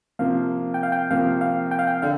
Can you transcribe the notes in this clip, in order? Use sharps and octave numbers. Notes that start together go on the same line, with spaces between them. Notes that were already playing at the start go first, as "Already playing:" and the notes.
C3 F3 A#3 F5
G5
F5
G5
C3 F3 A#3 F5
F5
G5
F5
G5
D3 F5